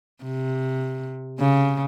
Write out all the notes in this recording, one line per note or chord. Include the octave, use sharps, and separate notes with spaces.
C3
C#3